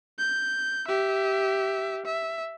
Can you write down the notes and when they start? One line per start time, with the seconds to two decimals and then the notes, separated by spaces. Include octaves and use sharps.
0.19 G6
0.88 G4 E5
2.06 E5